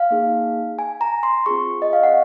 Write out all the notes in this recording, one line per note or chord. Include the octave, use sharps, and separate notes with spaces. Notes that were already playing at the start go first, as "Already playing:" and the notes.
Already playing: F5
A#3 D#4 G#4
G#5
A#5
C6
C4 F4 G#4 C#6
D#5
F5
F#5